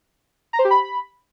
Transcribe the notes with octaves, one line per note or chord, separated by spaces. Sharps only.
A#5
C5
G4
B5